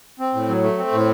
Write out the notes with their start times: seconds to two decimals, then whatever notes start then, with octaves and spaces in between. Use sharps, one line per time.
0.19 C4
0.34 A2
0.48 F#3
0.63 A3
0.78 C4
0.92 A2